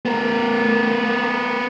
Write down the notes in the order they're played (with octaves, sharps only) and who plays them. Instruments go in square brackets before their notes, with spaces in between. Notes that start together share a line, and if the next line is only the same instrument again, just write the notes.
[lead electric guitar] B3 A#4